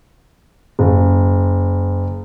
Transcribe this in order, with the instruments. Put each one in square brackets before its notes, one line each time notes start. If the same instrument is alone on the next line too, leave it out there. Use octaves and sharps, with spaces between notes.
[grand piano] F#1